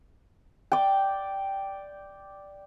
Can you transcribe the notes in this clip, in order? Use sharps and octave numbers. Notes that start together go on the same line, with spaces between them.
D5 G5